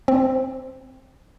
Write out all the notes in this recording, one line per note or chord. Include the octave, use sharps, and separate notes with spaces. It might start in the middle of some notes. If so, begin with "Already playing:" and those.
C4